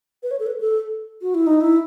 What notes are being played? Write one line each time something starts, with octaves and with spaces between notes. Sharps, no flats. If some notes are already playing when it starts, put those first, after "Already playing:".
B4
C#5
A4
B4
A4
F#4
E4
D#4
E4